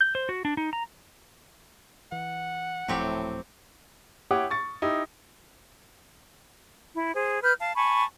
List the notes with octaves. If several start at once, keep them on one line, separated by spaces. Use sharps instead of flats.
G6
C5
F#4
D4
D#4
A#5
E3 F#5
D#1 A2 F3 F#3 A3 C4 G4
E4 G4 C#5 F#5 D6 D#6
C#6 A6 C#7
D#4 E4 G4
E4
G#4 C5
B4 F6 G6
F5 A5
G#5 A5 B5 C#6